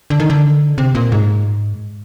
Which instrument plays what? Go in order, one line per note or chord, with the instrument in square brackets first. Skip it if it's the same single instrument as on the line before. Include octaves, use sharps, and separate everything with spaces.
[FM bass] D3
D#3
D3
C3
A#2
G#2